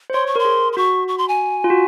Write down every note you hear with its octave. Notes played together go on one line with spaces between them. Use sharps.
C5
C#5 C6
C5 C#6
A#4 C6
G#4
C6
F#4 C#6
C#6
C6
G#5
F4
F#4